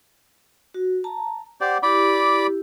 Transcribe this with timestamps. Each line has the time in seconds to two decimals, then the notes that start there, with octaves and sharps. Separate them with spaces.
0.74 F#4
1.04 A5 A#5
1.61 G4 C5 D5 F#5
1.83 E4 G4 D5 B5 D6